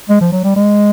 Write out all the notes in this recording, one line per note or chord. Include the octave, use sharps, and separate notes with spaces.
G#3
F3
F#3
G3
G#3